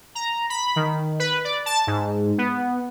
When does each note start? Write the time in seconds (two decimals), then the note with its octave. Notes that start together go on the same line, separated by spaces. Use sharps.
0.15 A#5
0.50 B5
0.76 D#3
1.20 B4
1.45 D5
1.66 A5
1.87 G#2
2.38 B3